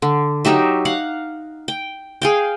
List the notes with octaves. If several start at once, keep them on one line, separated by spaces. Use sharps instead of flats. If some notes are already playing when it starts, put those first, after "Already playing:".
D3
F#3 D#4 G4 E5
F5 F#5
G5
G#4 F5 G5